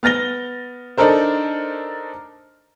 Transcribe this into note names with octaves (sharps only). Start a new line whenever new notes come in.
B3 F6 A6 A#6 G7
D4 D#4 A4 A#4 C5